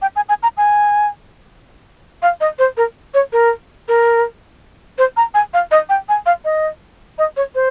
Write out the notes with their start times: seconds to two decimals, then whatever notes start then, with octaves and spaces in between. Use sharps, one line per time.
0.02 G5
0.16 G#5
0.29 G#5
0.43 A#5
0.57 G#5
2.23 F5
2.41 D#5
2.59 C5
2.77 A#4
3.14 C#5
3.33 A#4
3.88 A#4
4.98 C5
5.17 A#5
5.34 G#5
5.54 F5
5.71 D#5
5.89 G5
6.09 G#5
6.26 F5
6.45 D#5
7.19 D#5
7.37 C#5
7.55 C5